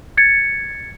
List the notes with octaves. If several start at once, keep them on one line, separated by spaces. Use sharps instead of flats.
G#6 A6 C#7